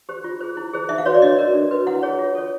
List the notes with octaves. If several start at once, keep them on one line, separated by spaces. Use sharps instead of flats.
G4 C5
F4
G#4 C5
E4
G#4 C5
D#4 E5
F5
F#4 B4 C#5
D5
D4 D#5
F#4 A#4
D4
F#4 B4
E4 F#5
G#4 C#5
F4
A4 C#5